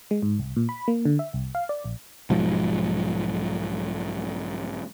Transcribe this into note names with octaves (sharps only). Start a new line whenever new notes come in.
G#3
G#2
C2
A#2
B5
A#3
D3
E5
C2
F5
D5
A#1
B1 G#2 F3